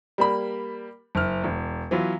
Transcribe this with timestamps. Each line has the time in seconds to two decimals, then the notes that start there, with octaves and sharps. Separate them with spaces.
0.18 G3 A#3 B5
1.15 F#1 F6
1.44 E1
1.91 E3 F#3 B3 F4